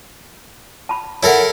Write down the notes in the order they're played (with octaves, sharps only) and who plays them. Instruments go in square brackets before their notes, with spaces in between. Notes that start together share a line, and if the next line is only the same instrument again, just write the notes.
[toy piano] A5 B5
[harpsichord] E4 A4 A#4 [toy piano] C#5 F#5